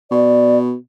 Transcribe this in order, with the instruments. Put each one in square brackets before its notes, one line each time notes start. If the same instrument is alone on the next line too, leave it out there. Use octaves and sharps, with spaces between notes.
[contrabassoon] B2 [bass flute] D5